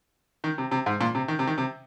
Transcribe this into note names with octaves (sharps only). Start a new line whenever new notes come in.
D#3
C3
C3
G#2
A#2
C3
D#3
C3
D#3
C3